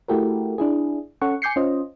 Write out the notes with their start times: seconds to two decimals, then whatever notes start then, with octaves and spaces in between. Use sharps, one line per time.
0.08 A3 E4 F#4 G4 A4 A#4
0.58 D4 E4 G#4
1.22 C#4 A4 F#5 C#6
1.42 G#5 D6 G6 C7 C#7
1.56 C#4 F4 C5 D#5